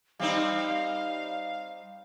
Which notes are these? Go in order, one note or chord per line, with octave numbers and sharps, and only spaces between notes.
G3 C4 D#4 F5